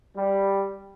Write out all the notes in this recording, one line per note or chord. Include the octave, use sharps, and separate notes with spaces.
G3